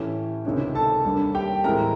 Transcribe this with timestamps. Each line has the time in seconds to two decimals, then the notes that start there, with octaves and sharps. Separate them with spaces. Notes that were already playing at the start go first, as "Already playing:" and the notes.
Already playing: A2 E3 A3 C#4 G4
0.45 C#2 C3 D#3 G#3 C#4
0.75 A4 A5
1.04 D#2 D3 G3 A#3
1.35 G4 G5
1.64 A2 E3 G#3 C4 A#4 A#5